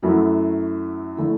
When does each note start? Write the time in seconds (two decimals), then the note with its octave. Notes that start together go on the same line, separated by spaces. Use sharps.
0.03 F#2 F#3 A3 E4
1.17 D3 A3 E4